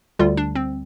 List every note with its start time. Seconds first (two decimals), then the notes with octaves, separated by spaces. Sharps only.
0.19 D2 D3 G3 F4
0.37 D4
0.55 C4